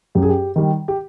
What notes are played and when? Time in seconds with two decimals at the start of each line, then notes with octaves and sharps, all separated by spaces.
0.15 F#2 G4
0.22 G#4
0.29 G4
0.56 D#3 G3
0.88 G4